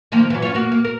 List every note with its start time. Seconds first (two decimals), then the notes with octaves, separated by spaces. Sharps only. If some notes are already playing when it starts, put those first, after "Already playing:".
0.12 D#3 F3 A#3
0.30 E3 F#3
0.42 C#4 F4 C#5
0.55 A#3 F#4
0.72 A#3
0.85 A#4